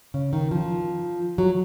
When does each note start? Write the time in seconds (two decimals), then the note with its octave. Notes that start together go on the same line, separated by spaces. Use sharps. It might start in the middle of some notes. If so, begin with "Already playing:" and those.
0.14 C#3
0.33 D#3
0.51 F3
1.38 F#3